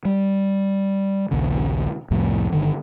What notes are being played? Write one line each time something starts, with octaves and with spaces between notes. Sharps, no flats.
G3
A#1 D#2 C#3
C2 F2 A2 F3
G1 D#2 D3 D#3